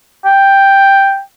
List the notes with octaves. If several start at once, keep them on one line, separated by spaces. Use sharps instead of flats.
G5